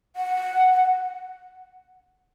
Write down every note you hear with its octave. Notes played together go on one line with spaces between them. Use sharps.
F#5